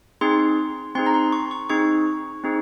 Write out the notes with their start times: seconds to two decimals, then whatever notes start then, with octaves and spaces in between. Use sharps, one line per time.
0.21 C4 D#4 G#4 C6
0.95 C4 D#4 G#4 C6
1.06 A#5
1.14 C6
1.32 C#6
1.51 C#6
1.69 C4 D#4 G#4 C#6
2.44 C4 D#4 G#4